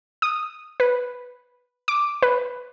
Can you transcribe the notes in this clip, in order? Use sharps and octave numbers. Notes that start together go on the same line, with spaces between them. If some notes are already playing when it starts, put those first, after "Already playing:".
D#6
B4
D6
B4